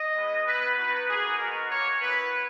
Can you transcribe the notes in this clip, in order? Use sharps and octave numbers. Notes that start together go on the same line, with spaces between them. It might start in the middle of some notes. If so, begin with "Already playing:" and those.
Already playing: D#5
G#3 B3 E4
B3 E4 B4
B3 D#4 F#4 B4
A#3 D#4 F#4 G#4
G#3 B3 D#4 F#4 A#4
A#3 C#4 F#4 C#5
B3 E4 B4